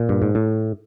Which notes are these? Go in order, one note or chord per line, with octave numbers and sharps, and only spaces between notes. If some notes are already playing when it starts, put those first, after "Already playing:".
Already playing: A#2
G2
G#2
A2